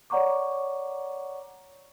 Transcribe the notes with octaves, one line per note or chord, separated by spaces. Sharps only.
C#5 D5 F#5 A#5 C#6 D6